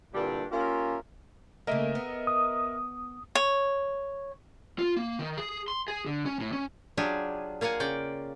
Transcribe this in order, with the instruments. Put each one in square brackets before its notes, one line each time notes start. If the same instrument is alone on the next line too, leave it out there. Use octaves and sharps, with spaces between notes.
[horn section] G2 A#2 D3 G3 D4 E4
A#3 C#4 F4 G4 A#4 E5
[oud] C#3 A3 A#3 [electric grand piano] A#4 D#5 E5
[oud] B3
[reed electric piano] D#6
[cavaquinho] C#5
[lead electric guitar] F4
A#3
D#3
G#4
C6
G#4
D3
C#4
A2
C#4
[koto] F#3 D4 F4 G4 G#4
A#3 F4 F5 F#5 G#5
C#3 D5 G5